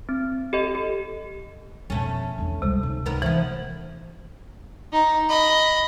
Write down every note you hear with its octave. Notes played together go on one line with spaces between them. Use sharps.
C4
G4 A4 D#5
G4
F2 B2 A3 C#4
E2 D4
C#2 C3 G3
C#2 D#4
D#2 B3 A#4
E3 F3 B3
D#4
D#5 B5